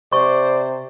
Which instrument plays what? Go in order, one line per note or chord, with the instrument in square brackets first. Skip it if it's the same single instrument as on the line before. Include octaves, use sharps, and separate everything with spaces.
[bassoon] C3 [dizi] C5 [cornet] D5 [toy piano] C#6